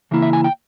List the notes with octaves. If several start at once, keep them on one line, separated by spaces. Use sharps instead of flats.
C#3 E3 A#3 E4
E5
G#5
G5